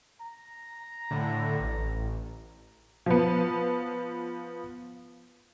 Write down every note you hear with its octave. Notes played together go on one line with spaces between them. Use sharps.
A#5
A2 D3
A1
F3 B3